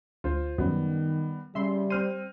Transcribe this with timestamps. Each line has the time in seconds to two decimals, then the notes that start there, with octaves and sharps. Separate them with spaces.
0.24 D2 F4 C5
0.58 F#2 D#3 G3 B3
1.55 C#3 G3 E5 C6
1.90 C4 C5 F6 D#7